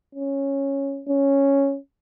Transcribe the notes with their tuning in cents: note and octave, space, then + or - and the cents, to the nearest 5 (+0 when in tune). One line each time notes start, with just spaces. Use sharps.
C#4 -5
C#4 +0